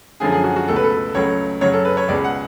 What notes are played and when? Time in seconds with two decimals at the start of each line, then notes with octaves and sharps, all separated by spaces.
0.20 F#2 D3 F3 G#3 G#4
0.32 G#4
0.44 F#4
0.56 F#4
0.68 C#2 B2 A3 A4
0.76 B4
0.84 A4
1.15 C#2 C#3 F#3 A3 C#5
1.61 F#2 C#3 F#3 C#5
1.73 A4
1.85 B4
1.97 C#5
2.08 C#2 B2 G#3 D5
2.24 F#5